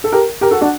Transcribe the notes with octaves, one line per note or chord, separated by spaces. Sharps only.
A4
G4 A#4
G4 A#4
F#4 A4
D4 F#4